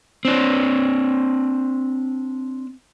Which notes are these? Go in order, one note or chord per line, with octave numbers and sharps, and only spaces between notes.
C4 D4